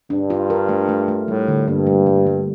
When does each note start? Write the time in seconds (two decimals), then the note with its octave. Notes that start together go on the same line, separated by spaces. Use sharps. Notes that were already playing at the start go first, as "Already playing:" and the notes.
0.10 G2 D4
0.30 F4
0.50 A#4
0.69 A3
0.89 A3
1.08 A3
1.28 A2 G3
1.48 D3
1.67 G2 A#3
1.87 G3
2.07 G3
2.27 G3